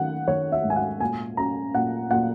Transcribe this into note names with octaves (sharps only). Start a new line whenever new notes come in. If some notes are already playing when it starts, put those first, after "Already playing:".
Already playing: D#3 C#4 F#5
D#3 C#5
E5
G#2
G#5
F#5
A#2 G#5
C#4 A#5
A#2 F#5
A#2 F#5